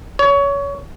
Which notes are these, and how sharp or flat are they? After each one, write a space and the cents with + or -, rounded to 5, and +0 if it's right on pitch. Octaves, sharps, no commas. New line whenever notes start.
C#5 +25